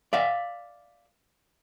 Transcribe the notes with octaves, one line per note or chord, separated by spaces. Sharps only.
D5 E5 F5